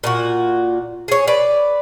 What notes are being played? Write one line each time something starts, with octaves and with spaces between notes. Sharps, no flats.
A#2 F4 F#4
G#4 C#5
B4 D5